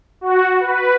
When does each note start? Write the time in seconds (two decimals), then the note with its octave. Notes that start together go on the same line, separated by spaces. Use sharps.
0.21 F#4
0.60 B4